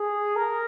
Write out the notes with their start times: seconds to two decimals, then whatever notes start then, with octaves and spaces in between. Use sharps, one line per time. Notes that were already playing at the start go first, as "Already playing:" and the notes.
Already playing: G#4
0.36 A#4